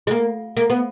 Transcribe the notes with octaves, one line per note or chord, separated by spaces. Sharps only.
G#3
A#3
A#3
B3